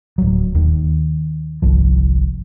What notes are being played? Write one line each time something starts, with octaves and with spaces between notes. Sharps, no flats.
D1 F#3
D#2 D#3
G1 C2 F3